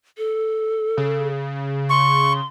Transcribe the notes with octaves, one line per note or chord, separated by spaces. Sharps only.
A4
C#3
C6 C#6